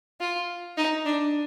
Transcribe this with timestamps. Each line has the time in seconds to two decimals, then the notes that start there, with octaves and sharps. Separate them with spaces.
0.20 F4
0.77 D#4
1.06 D4